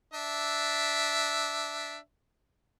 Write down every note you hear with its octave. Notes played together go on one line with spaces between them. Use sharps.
D4 E5